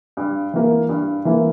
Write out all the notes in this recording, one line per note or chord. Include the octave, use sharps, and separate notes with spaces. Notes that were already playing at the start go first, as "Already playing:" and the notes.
G2
E3 A#3
G2
E3 A#3